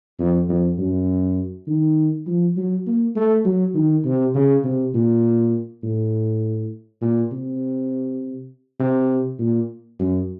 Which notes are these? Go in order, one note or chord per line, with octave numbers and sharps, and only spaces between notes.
F2
F2
F#2
D#3
F3
F#3
A#3
A3
F#3
D#3
C3
C#3
C3
A#2
A2
A#2
C3
C3
A#2
F#2